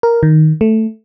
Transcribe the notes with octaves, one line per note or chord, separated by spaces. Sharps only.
A#4
D#3
A3